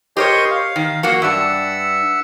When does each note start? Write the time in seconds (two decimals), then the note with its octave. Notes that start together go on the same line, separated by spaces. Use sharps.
0.17 G4 A#4 C5 C#5 D#5 C6
0.51 F5
0.76 D#3
1.03 F#3 A#3 F#4 F#5
1.22 G2 D4 E5 F#5 E6